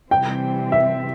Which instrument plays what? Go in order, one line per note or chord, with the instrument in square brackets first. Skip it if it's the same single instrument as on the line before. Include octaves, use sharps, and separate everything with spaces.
[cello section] C3 E3 G3 C4 [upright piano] G5
[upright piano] E5